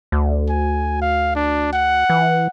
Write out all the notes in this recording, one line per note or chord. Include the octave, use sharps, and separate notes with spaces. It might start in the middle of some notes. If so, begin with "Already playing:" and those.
D2
G#5
F5
D4
F#5
E3